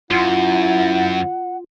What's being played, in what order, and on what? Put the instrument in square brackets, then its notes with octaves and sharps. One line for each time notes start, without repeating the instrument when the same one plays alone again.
[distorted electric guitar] F#2 [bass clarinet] E4 [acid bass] F4 [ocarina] F#5